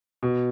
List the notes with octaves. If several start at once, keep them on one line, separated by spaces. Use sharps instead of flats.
B2